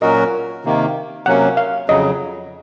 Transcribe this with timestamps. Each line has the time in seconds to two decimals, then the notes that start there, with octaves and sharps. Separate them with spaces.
0.02 A#2 F#3 C#4 F#4 A#4 D#5
0.64 C3 D#3 A#3
1.26 C3 F#3 A#3 C#4 F#5
1.57 F5
1.89 F2 C#3 F#3 D#5